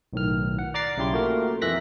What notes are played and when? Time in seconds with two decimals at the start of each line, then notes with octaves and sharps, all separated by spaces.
0.13 B1 A2 D#3 F6
0.59 F#5
0.74 D5 A#5 D6 A6 C7
0.97 B1 C#3 E4 G4 C6
1.13 A3 A#3 F4 F#4 A#4
1.62 F2 E3 E5 F#6 A#6 B6